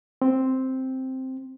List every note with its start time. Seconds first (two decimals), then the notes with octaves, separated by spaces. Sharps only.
0.22 C4